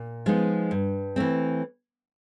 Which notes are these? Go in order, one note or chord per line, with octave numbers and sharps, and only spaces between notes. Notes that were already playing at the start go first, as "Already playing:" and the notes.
Already playing: A#2
F3 G#3 B3 D#4
G2
E3 A3 C4